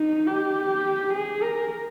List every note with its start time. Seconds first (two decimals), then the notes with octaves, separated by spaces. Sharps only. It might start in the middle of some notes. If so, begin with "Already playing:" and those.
Already playing: D#4
0.26 G4
1.14 G#4
1.43 A#4